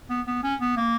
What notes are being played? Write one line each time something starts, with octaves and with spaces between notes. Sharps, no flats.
B3
B3
C#4
B3
A#3